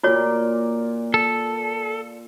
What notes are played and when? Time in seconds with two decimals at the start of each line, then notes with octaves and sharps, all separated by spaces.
0.03 A#2 F4 F#4 A#4 C#5 D5
1.14 A4